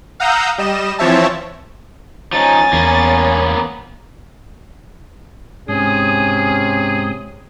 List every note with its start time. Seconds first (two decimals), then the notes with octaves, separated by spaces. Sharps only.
0.20 F5 F#5 A#5 D#6 E6 G6
0.58 G3 D#5 E7
0.99 E3 F3 C4 C#5 E5 A5
2.33 F3 C#4 D#4 G#5 A6
2.73 E2 A#3 B3
5.68 G#2 C3 C#4 G#4 D#6